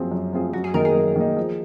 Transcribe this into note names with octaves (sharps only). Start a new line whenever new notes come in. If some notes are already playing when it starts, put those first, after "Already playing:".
Already playing: F#2 F3 C4 F4 G#4
F#2
F3 C4 F4 G#4
F#2 F#4
G#4
D#3 A#3 D#4 A#4
G#4
F#2
D#3 A#3 D#4
F3